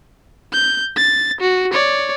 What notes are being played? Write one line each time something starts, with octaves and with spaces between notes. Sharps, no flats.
G6
A6
F#4
C#5 D5